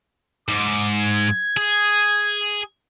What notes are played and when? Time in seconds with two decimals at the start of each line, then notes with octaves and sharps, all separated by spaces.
0.48 G#2 D6
1.00 G#6
1.57 G#4